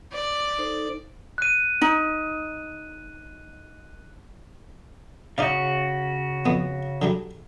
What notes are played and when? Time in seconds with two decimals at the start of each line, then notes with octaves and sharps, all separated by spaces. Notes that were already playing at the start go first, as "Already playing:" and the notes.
0.12 D5
0.58 D#4 A4 C5
1.38 F#6 D#7
1.82 D#4
5.38 C#3 D#4 F#4 D5 F5
6.46 F2 B3
7.02 D3 F#3 G3